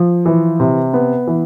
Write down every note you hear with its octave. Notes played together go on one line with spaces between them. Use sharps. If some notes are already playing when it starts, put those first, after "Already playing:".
Already playing: F3
E3
C3
B3
E3